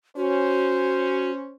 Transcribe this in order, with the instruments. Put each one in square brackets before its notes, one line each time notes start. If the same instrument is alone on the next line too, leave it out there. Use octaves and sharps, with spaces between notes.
[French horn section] C#4 [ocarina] F#4 [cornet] C5